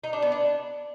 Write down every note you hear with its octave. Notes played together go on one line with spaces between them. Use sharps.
D#4
D4
B3
D4